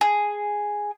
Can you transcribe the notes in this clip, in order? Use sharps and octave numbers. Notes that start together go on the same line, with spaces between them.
G#4